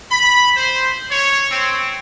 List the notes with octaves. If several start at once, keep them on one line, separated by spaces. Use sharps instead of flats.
B5
C5
C#5
C4